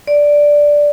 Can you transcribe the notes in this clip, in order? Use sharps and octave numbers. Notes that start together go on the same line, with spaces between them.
D5